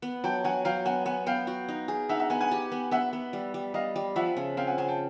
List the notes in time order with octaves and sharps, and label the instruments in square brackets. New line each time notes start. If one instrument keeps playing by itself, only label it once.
[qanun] B3
[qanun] F#3 [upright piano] G5 A5
[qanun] F#3 [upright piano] F#5 G#5
[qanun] F#3 [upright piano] F5 G5
[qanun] B3 [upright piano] F#5 G#5
[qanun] B3 [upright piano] F#5 G#5
[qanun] B3 [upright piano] F5 G5
[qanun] F#4
D#4
G#4
[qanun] D#4 [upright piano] E5 F#5
[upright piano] E5 F#5
[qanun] B3 [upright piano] F#5 G#5
[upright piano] F#5 G#5
[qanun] G4
B3
[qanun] B3 [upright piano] E5 F#5
[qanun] B3
G3
G3
[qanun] G3 [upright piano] D#5 F5
[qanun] G3
[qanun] F3 [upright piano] E5 F#5
[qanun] C#3
[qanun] C4 [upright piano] F5 G5
[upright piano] F#5 G#5
[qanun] C#3 [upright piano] F#5 G#5
[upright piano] G5 A5